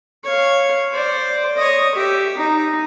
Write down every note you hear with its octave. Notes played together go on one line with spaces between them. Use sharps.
C#5 F5
C5 D5
C#5 D#5
G4 E5
D#4